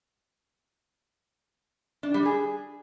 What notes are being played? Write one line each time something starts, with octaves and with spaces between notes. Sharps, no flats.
D4
G3
G#4